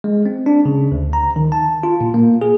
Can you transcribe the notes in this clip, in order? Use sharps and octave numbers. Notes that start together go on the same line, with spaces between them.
G#3
C4
D4
C#3
D2
A#5
D#3
A5
F4
A#2
A#3
G#4